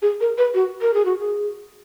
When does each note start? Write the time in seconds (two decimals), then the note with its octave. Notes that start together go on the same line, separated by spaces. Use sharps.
0.02 G#4
0.21 A#4
0.38 B4
0.54 F#4
0.81 A#4
0.94 G#4
1.05 F#4
1.19 G#4